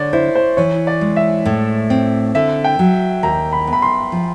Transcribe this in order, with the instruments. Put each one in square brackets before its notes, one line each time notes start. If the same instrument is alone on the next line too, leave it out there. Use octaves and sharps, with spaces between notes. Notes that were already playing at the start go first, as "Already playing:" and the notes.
Already playing: [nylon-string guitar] D3 [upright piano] C#5 D5
[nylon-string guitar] E4 [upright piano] C5
[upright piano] C5
[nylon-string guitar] E3 [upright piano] C#5
[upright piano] D5
[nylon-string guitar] G#3
[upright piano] E5
[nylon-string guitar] A2
C4
[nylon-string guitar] D3 [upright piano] E5
[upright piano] G5
[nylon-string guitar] F#3
[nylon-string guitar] D#2 [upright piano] A#5
[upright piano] B5
[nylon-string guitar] B3
[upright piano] B5
C6
[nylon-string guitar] F3